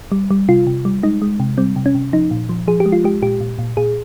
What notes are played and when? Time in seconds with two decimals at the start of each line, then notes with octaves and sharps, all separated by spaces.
0.12 G3
0.31 G3
0.49 C3 F4
0.67 C3
0.85 G3
1.03 G#3 D#4
1.22 G#3
1.40 C3
1.58 G3 C4
1.76 C3
1.86 C#4
1.95 C3
2.13 F3 D#4
2.31 A#2
2.49 F3
2.68 F3 G#4
2.80 G4
2.86 G#3
2.92 F4
3.04 G#3 G4
3.22 A#2 G4
3.40 A#2
3.59 A#2
3.77 A#2 G#4